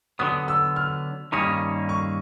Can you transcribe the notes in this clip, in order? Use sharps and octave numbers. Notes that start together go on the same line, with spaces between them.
D3 F#3 B3 D#6
E6
F6
G2 D#3 G3 A#3 C#4 D#6
C#6